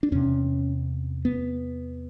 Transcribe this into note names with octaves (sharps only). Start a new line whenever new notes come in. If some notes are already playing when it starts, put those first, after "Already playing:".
D4
E2 C3 C#4
B3